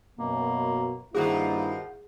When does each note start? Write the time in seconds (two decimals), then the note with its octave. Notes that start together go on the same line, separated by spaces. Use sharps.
0.19 F#2 B2 A#3
1.15 G2 D#3 F3 A#3 E4 F#4 G#4